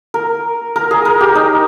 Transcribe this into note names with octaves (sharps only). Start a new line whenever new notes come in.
A#4
A#4
G#4
A#4
G4
D#4